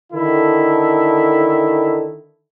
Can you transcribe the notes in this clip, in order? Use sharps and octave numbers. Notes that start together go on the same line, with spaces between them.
D3 D#3 E4 A4